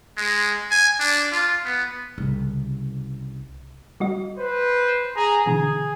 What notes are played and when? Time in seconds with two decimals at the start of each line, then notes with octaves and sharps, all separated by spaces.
0.17 G#3
0.70 G#5
1.00 D4
1.32 F4
1.65 B3
2.18 C2 C#3
4.00 G3 F#4 D#5
4.38 B4 C5
5.16 G#4 A#5
5.46 B2 D3 E3 G#4